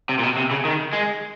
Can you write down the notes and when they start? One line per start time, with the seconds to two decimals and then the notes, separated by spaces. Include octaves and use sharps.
0.09 C3
0.19 A#2
0.23 B2
0.37 C3
0.51 C#3
0.65 D#3
0.93 G#3